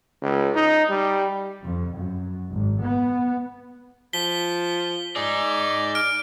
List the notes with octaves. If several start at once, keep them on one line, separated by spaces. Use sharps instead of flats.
C#2
D#4
G3
F2
F#2
G#1
B3
F3 B6 G7
D#4 G#4 D5
F6 D7